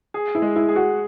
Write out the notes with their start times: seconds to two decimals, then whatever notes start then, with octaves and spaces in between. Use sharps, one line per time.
0.14 G#4
0.35 E4
0.42 G#3
0.56 E4
0.69 G#4
0.76 F#4